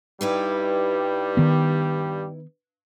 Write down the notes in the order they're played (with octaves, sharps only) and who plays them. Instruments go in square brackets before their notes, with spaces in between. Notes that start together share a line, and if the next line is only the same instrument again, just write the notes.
[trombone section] G2 G3 G4 [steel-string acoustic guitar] D#4 E4 B4
[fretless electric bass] D#3 B3